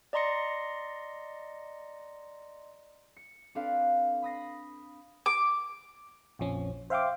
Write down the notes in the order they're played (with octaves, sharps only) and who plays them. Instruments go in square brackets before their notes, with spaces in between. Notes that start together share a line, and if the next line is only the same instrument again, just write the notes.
[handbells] D5 D#5 A#5 C6 A#6 C#7
[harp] C#7
C4 D4 A4 B4 F5
B5 D#6 A#6 C7
[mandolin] D6
[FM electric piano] A#1 F2 F3 C#4
C5 E5 F5 G5 C6 D6